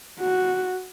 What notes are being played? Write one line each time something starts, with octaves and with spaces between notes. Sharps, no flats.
F#4